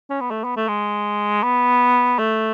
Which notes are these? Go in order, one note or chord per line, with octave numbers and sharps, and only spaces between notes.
C#4
B3
A3
B3
A3
G#3
B3
A3